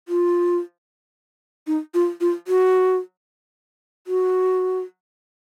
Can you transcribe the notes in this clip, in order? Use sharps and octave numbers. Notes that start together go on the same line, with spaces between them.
F4
D#4
F4
F4
F#4
F#4